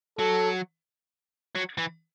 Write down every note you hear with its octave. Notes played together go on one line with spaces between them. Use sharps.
F#3 A4
F#3
E3